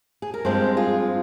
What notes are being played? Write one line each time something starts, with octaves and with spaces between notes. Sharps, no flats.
G#4
A#4
G2 F3 G#3 C4 G#4 C5
F4 G#4